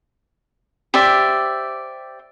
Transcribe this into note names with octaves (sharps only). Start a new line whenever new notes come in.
G4 C5 D5 E5